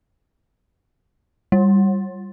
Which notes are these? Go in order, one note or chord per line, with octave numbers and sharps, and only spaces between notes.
G3